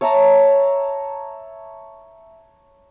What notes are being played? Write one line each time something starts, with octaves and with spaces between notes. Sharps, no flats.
C#5 E5 A5 A#5